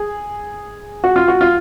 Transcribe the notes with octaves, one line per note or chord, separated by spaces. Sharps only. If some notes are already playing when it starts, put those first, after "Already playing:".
Already playing: G#4
F#4
F4
F#4
F4